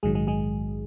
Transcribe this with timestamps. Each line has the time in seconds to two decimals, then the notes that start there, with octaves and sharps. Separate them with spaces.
0.03 A#1 G#2 D#3 F#3 G#3 G#4
0.15 G#3 G#4
0.27 G#3 G#4